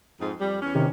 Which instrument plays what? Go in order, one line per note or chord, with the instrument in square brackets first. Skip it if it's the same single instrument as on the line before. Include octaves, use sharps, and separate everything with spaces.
[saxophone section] F2 G#2 D#4
F2 G3
E2 C#4
[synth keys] C3 D#3 G4